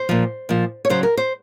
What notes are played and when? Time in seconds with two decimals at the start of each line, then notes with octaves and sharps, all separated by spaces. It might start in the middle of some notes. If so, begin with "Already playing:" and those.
Already playing: C5
0.09 A#2 F3
0.49 A#2 F3
0.85 C#5
0.90 C#3 F#3 C5
1.03 A#4
1.17 C5